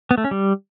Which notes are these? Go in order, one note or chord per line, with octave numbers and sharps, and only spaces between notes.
B3
A3
C#4
G3